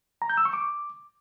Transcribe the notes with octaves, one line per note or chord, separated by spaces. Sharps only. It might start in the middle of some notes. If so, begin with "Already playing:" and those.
A#5
G6
E6
C#6
D6